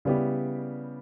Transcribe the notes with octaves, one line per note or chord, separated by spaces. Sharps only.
C#3 G3 B3 E4 G4